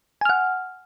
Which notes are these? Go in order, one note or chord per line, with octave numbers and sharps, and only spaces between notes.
F#5 G#5 F6